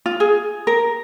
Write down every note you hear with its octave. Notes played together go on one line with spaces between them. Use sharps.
F4
G#4
A#4